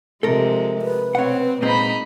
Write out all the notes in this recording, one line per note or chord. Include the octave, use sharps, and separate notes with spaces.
C3 F3 G#3 A4 A#4
B4
B2 C4 C#5 F#5
A#2 G#3 A#3 C4 D#4 B5